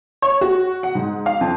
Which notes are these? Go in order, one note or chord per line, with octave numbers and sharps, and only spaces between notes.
C#5
F#4
F#5
G#2
F5
F2